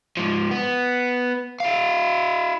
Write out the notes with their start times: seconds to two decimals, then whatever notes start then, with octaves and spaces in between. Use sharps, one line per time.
0.17 G#2 F3
0.51 B3
1.60 E4 F5